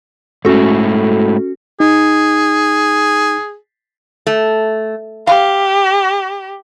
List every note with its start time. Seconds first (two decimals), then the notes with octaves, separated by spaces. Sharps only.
0.45 G#2 A3 C#4 F#4 A4
1.80 D#4 G#4
4.27 A3
5.27 G4 F5